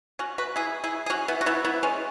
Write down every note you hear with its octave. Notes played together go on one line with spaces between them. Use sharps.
C#4 F#4
F#4 B4
E4 G#4
E4 G#4
G#4
C#4 F#4
B3 E4
F#4
B3 E4
B3 E4
G#3 C#4